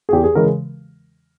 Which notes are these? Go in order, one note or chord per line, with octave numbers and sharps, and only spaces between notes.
G#4
E2 G4
G#4
C#3 E3 G#3 A#4